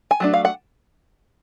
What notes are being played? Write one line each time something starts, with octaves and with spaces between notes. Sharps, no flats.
G#5
F#3 A3 D4
F5
F#5